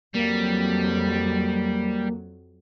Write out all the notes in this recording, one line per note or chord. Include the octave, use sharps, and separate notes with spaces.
F2 F#3 G3 A#3